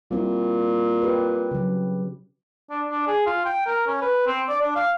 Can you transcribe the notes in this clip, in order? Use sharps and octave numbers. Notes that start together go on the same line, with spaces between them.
A#2 G3 C4 E4
G4 B4
C#3 F#3
D4
D4
G#4
F4
G5
A#4
C#4
B4
C4
D5
D4
F5